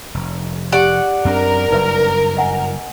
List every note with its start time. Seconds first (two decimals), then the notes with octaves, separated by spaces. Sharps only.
0.14 F1
0.72 G4 D5 F#5
1.25 F#2 C4 D4 A#4
1.70 F#1 G2 D#4 B4 E5
2.37 D#5 F#5 G#5